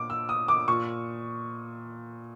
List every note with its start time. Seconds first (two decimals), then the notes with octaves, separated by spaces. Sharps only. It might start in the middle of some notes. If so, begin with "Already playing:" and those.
Already playing: A#2 D6
0.10 E6
0.29 D#6
0.48 D6
0.68 A#2 C#6